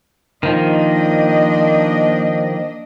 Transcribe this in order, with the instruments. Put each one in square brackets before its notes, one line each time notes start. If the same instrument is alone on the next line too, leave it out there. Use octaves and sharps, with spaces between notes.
[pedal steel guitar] D#3 F3 [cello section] A#3 D4 D#5